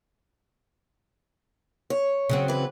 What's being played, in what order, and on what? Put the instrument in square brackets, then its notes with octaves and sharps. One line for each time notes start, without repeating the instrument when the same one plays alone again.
[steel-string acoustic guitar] C#5
[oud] C#3 F#3 C4
[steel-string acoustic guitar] E3 B4